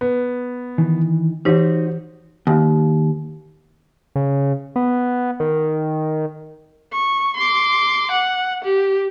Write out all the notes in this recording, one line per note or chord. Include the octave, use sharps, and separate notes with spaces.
B3
D#3 E3
E3 D#4 F#4 G4 C5
D#2
C#3
B3
D#3
C#6
C6 D6
F#5
G4